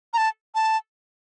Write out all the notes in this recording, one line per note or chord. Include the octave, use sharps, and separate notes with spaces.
A#5
A5
A5